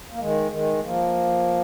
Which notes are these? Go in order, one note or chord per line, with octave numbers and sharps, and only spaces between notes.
A#3
D#3 G#3
D#3 G#3
F3 A#3